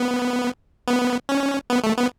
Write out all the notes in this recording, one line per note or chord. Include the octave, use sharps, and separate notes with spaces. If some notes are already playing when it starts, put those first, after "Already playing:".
Already playing: B3
B3
C#4
B3
A3
B3